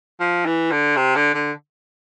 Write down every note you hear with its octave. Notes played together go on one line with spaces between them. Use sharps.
F3
E3
D3
C3
D3
D3